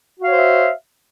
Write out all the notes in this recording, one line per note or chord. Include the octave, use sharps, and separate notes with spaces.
F#4 C5 C#5 E5 F5